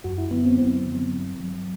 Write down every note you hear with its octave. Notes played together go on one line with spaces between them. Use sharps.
F#2 F#4
E4
D3 F#3 B3
C4
F#2 C4
D3
F#3
G2
F#3